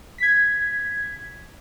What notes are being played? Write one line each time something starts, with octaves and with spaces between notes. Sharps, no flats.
G#6 B6